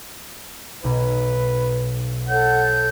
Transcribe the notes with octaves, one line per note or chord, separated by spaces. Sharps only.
B1 B4
A4 C#5 F#5 G6